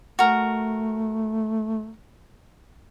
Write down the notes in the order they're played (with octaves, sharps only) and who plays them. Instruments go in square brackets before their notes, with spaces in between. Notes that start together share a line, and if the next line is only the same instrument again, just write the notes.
[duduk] A3 [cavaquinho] F#4 A#4